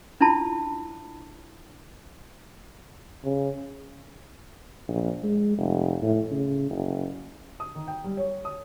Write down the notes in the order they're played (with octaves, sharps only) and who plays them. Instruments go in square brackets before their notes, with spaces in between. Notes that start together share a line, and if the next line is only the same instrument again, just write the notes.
[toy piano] D4 E4 F4 A5 B5
[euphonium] C#3
[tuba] A#1
G#3
F1
A2
C#3
F#1
[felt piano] D#6
D#3
G5
G3
C#5
D#6